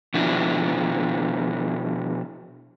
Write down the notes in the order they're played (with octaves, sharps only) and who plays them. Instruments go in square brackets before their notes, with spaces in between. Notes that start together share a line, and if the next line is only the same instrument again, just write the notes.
[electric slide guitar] B2 F3 D4 E4